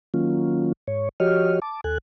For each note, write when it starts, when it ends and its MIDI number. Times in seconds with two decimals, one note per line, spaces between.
0.14 0.72 51
0.14 0.72 54
0.14 0.72 58
0.14 0.72 61
0.14 0.72 65
0.88 1.09 44
0.88 1.09 73
1.20 1.59 53
1.20 1.59 66
1.20 1.59 67
1.20 1.59 73
1.20 1.59 75
1.20 1.59 89
1.62 1.81 81
1.62 1.81 86
1.84 1.98 39
1.84 1.98 69
1.84 1.98 80
1.84 1.98 90